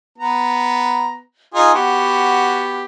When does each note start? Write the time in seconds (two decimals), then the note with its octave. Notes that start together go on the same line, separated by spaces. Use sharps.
0.18 B3 A#5
1.55 D#4 F4 G#4
1.75 B3 F#4 G4